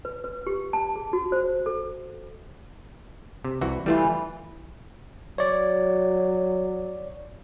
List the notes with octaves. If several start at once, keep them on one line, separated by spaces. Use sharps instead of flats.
B4
B4
G4
A5
G#4
F#4
C5
A4
C3
C2 E3 F#4
E3 G3 A3 F4
F#3 C#5 D5